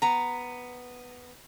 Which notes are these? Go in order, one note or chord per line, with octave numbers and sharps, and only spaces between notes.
B3 A#5